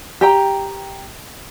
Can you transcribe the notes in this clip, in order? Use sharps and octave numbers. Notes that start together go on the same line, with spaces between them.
G4 G5 A#5